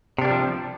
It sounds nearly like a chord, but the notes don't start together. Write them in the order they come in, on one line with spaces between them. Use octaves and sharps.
C3 D4 A#3 G3 F3